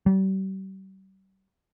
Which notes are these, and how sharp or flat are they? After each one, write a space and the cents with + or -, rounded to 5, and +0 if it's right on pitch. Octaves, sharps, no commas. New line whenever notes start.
G3 -40